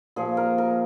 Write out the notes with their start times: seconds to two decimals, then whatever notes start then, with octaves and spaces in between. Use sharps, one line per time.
0.16 A#2 F3 G#4
0.37 A#4
0.58 A#4